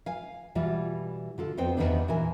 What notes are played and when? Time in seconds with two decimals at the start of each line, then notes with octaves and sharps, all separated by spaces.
0.06 F5 G#5
0.55 B2 E3 G3 F4
1.38 D3 F4 A4
1.57 F2 B3 C4 C5 G5
1.77 E2 B2 D#3 G3 B3 D4
2.08 A#2 E3 A#4 G#5